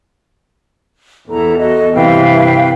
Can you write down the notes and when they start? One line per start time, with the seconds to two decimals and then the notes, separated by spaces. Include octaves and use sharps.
1.29 E2 E4 A4 A#5
1.59 F#4 A4 D#5
1.94 G2 C3 E3 B4 F5 G5